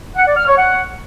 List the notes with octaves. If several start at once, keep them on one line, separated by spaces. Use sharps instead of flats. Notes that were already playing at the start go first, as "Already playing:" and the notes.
F#5
D5
F6
C#5
F#5